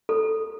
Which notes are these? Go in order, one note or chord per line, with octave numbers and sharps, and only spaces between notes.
A4